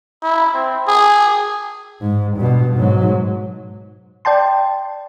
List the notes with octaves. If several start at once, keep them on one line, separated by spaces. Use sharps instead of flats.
E4
C4
G#4
G#2
G2 B2
G#2 F#3
D5 G5 A5 C6